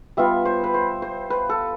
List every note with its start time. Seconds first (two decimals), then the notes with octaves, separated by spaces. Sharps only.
0.17 G3 B3 F4 E5
0.45 C5
0.64 B4
0.74 C5
1.02 C5
1.30 B4
1.49 A4